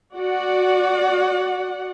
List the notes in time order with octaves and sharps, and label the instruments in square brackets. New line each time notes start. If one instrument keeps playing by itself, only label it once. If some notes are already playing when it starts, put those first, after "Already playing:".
[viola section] F#4 D5 F#5